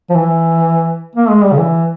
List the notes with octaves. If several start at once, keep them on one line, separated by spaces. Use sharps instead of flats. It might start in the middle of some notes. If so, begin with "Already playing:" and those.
F3
E3
A#3
G#3
G3
C#3
E3